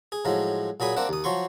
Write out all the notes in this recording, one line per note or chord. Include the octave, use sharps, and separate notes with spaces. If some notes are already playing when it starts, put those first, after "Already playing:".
G#4
A2 F3 F#3 G#3
A#2 F#3 G#4 B5 D#6
A#3 C4 D4 F#5
D#2 D#6
F3 F#3 C6 C#6